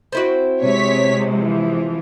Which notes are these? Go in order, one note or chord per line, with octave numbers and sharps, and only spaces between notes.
C4 E4 F#4
C3 G#3 C#5 B6
E3 F3